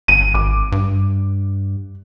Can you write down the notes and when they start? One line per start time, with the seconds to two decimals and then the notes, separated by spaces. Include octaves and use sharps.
0.08 G1 D#7
0.34 G#1 D6
0.72 G2